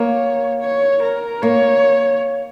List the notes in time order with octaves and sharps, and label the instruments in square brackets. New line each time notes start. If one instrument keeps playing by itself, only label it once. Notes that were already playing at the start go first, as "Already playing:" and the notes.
Already playing: [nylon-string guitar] A#3 [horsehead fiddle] C#5
[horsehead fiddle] C#5
A#4
[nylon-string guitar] A#3 [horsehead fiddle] C#5